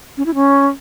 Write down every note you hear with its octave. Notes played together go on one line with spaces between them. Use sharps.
C#4
E4
C#4